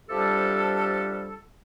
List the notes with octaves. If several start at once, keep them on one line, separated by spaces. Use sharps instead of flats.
C3 F3 G3 D4 G4 A4